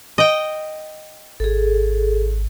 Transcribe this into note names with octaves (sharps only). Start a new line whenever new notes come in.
D#5 G5
G#1 G#4 A4